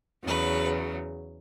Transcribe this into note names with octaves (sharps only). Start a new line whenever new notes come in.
E2 C#3 F#3 B4